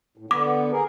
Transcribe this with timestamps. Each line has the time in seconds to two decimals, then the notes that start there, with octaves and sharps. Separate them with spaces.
0.17 A2
0.31 D3 B3 D6
0.72 G#4 A#4